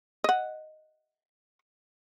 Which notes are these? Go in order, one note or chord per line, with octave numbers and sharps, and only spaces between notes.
D#5 F#5